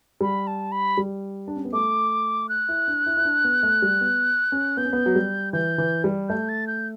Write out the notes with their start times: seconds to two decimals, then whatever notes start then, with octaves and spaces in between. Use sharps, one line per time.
0.21 G3 B5
0.47 A5
0.72 B5
0.97 G3
1.47 D4
1.56 C#4
1.65 B3
1.73 A3 D6
2.49 F#6
2.68 E4
2.87 D4
3.06 E4
3.17 E4
3.25 D4
3.44 B3
3.63 A3
3.82 G3
4.01 B3
4.52 C#4
4.77 B3 G6
4.85 C#4
4.93 B3
5.06 F#3
5.15 G3
5.53 E3 G6
5.78 E3
6.04 G3
6.29 A3 G6
6.49 A6
6.67 G6